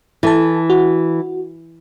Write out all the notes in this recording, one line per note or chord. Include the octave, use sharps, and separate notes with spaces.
E3 E4 A4 A5
F#4